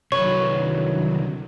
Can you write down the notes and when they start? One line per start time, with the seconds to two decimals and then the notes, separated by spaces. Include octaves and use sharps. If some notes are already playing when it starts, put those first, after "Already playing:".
0.12 C2 D3 D#3 F#3 B4 C#5 C#6